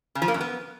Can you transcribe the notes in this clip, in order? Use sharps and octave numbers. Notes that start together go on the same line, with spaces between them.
C#3
F3
A#3
F#2
B3